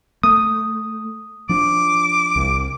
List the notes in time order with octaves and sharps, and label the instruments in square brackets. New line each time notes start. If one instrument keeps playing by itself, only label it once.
[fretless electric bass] A3 [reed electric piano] D#6
[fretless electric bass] F3 D4 [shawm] D6
[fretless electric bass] C2